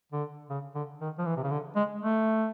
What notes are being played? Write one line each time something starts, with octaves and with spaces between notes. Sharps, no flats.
D3
C#3
D3
D#3
F3
E3
C3
C#3
D3
G#3
A3